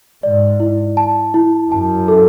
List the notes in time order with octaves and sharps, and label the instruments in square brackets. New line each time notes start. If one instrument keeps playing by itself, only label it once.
[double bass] G#2 [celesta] D5
[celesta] E4
A5
E4
[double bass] F#2 [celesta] A5
[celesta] A4